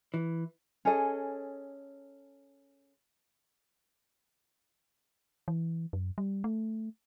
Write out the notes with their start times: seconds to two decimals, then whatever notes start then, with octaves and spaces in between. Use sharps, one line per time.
0.14 E3
0.85 C#4 G#4 A4 D#5
5.48 E3
5.93 F#2
6.18 G3
6.44 A3